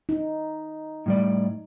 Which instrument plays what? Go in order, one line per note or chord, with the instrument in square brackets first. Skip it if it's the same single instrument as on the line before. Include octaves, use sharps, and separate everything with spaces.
[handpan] D#4
[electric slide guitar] A2 G3 D5